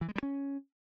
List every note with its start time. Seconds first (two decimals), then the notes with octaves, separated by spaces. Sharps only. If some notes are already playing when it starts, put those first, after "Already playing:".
0.01 E3
0.08 G#3
0.16 G3
0.23 C#4